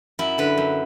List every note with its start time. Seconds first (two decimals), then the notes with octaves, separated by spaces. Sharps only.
0.19 F#2 E4
0.38 D3 B4
0.58 F#2